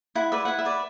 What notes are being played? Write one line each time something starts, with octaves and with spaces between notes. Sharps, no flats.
E4 F#5
B4 D5 E5
E4 F#5
E5
B4 D5